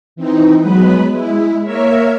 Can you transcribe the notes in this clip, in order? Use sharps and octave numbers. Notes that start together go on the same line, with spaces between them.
E3 C4 D#4
F#3 G#3 B3 B4
G#3 E4
A#3 A#4 C#5 E5